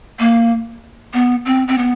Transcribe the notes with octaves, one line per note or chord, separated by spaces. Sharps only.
A#3
B3
C4
C4
B3